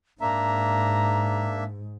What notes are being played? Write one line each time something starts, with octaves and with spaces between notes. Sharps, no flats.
G#2 A#3 D4 E5 A#5